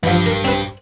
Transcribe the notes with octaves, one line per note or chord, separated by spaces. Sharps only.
G2 E3 F3 G3
A#4
C4 B4